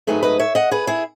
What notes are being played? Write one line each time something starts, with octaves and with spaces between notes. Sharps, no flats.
G#2 D#3 F#3 A3 G#4 B4
B4 D#5
C#5 E5
D#5 F#5
G#4 B4
E4 G#4